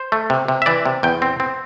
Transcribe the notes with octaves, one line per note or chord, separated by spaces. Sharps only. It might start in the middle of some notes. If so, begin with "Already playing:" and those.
Already playing: C5
A3
C3
C3
E5
E3 D5
C3
E2 G5
C4
C4